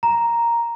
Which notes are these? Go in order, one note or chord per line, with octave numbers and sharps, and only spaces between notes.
A#5